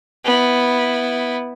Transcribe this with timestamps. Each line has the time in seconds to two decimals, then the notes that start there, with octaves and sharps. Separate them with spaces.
0.24 B3 E4